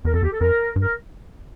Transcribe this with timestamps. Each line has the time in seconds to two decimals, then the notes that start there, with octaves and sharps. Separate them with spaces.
0.05 E2 A#4
0.14 F2 A4
0.23 E2 G4
0.31 A4
0.40 F2 A#4
0.76 G2
0.82 A#4